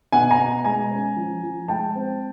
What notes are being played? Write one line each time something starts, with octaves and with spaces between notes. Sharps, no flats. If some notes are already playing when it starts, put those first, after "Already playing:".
B2 F#5 G#5
G#5 A#5
B2
G#3 G#5 A#5
C#4
F3
F3
G#3 G5 A5
C4